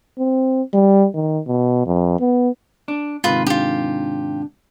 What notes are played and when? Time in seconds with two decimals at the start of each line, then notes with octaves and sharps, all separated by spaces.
0.19 C4
0.74 G3
1.14 D#3
1.47 B2
1.86 F2
2.20 B3
2.88 D4
3.24 G#2 C3 D#3 F4 B4
3.47 D4 F4 G4